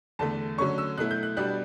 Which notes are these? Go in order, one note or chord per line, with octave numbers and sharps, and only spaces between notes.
E2 D3 A3 A5
D3 F#3 A3 C#4 C#6
E6
B2 F#3 A3 E4 F#6
G6
F#6
B2 G3 B3 D4 F#6